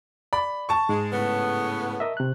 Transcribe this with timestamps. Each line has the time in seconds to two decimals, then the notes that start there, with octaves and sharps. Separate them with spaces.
0.33 D5 B5
0.69 A5 C#6
0.89 G#2 G#3
1.12 A2 C#3 B3
2.00 A#4 D#5 E5
2.17 C3 F#6